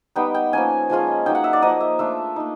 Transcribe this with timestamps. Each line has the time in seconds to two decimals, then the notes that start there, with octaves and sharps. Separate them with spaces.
0.16 G3 B3 D#4 G5
0.34 G5
0.53 F3 A#3 C#4 G#5
0.90 F3 G#3 C#4 F4
1.26 F#3 A#3 D#4 G5
1.35 F#5
1.44 E5
1.53 D5
1.62 F3 A#3 D#4 D#5
1.80 E5
1.99 A3 D4 F4 E5
2.36 A#3 D#4